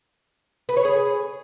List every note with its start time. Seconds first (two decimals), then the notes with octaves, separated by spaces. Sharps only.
0.69 B4
0.77 C#5
0.85 G#4